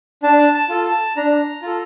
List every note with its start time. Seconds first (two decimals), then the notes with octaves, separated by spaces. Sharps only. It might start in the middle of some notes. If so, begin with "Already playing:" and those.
0.23 D4 A5
0.54 A5
0.69 F4 A4
0.85 A5
1.17 D4 A#5
1.62 F4 A4